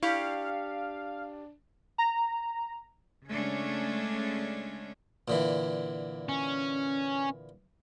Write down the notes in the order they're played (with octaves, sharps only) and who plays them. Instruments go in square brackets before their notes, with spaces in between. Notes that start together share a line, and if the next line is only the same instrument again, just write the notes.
[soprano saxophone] D4 [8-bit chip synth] E4 [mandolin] G4 C#6 [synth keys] F5
[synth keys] A#5
[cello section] C#3 G#3 A3 C#4 D4
[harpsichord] A#2 D3 E3
[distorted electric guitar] C#4